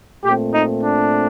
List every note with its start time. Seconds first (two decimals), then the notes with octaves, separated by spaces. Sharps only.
0.24 A#2 A3 C4 G4
0.53 D#4
0.82 D4